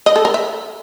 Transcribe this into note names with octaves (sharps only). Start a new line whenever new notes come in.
D#5
A4
A#4
E5